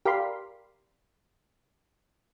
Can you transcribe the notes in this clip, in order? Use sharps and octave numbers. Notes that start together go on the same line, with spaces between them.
G4 A#4 D5 F5 B5 C6